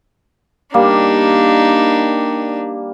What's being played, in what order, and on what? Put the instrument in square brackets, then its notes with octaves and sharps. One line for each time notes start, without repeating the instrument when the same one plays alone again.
[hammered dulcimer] G3 A#3 [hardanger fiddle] D4 D#4